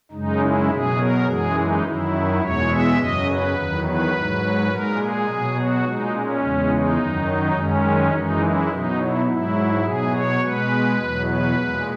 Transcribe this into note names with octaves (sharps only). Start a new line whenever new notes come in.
F#2 C#3 G#3 D#4
E4
B2 F#3 G#4
A#4
F#2 E3 G#3 G#4
D#4
F#2 D#3 F#3 E4
E2 B2 G#3 C#5
E5
F#2 C#3 F#3 D#5
B4
E2 D#3 F#3
B4
G#2 F#3
A#2 G#3 A#4
G#4
B2 F#3
F#4
A#2 G#3 D#4
C#4
E2 C#3 G#3
D#4
F#2 D#3 F#3
F#2 D#3 G#3 C#4
F#2 E3 G#3 D#4
E4
B2 F#3 D#4
E4
G#2 F#3 E4
B2 F#3 G#4
C#5
B2 G#3 B4
E2 B2 F#3
B4
A#2 G#3